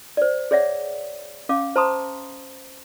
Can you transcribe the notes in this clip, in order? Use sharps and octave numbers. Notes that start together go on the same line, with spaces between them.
C5 D5
G#4 C#5 D5 E5 F#5
C#4 F5 D6
C5 A5 A#5 C6 D#6